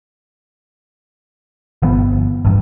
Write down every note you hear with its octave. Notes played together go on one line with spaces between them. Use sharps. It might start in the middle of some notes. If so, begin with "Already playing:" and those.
G1 F3 B3
A1 G2